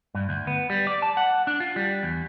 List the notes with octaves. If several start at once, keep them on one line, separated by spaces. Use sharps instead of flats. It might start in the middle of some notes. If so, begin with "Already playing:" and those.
G2
D2
B3
G3
D5
A5
F#5
D4
F4
G3
E2